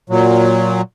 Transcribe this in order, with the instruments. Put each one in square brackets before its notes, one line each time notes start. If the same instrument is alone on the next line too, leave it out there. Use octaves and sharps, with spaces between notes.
[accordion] A#2 F#3